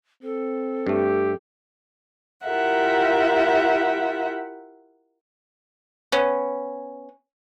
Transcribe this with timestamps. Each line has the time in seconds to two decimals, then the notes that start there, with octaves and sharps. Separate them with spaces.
0.23 C4 A4
0.87 G2 A3 G4
2.45 E4 F4 G4 A#4 E5 F#5
6.12 B3 C#4